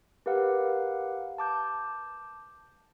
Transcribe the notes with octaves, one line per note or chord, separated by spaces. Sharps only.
G4 A#4 B4 F5 F#5
A5 D6 G6